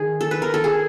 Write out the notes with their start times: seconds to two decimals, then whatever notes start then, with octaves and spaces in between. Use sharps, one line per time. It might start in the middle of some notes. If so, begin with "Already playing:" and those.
Already playing: D#3 G#4
0.21 A4
0.31 B4
0.42 A#4
0.54 A4
0.64 G#4